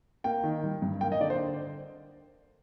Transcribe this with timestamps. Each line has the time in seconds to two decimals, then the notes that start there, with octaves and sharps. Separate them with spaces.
0.24 A#3 G5
0.44 D#3
0.64 G3
0.82 G2
1.01 A#3 G5
1.12 D#5
1.20 D3 D5
1.30 C5